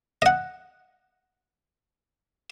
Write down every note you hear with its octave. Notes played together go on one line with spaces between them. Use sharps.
D#5 F#5